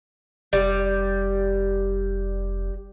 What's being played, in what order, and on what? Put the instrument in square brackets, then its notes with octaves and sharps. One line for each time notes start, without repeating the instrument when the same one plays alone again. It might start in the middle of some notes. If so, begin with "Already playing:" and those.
[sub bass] F1 [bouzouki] G3